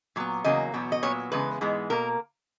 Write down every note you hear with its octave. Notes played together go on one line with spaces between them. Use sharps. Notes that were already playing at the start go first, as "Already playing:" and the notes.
A#2 F#3 B3
E2 C#3 F#3 A#3 D#5
E2 B2 F#3 B3
D#5
A#2 F#3 B3 C#5
E2 C#3 G#3 B3 B4
G#2 E3 G#3 B3
B2 A#3 A#4